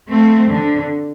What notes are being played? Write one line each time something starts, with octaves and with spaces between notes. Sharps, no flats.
A3 C4
D3